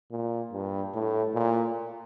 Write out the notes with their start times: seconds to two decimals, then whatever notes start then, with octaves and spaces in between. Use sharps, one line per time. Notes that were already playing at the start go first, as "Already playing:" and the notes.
0.11 A#2
0.53 G2
0.94 A2
1.35 A#2